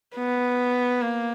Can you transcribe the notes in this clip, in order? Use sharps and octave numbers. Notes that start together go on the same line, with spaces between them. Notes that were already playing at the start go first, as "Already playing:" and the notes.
B3
A#3